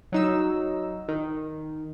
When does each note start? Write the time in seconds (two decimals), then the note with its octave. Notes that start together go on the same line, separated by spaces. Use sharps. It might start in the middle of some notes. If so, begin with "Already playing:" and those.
0.12 F#3 D#4 E6
1.08 D#3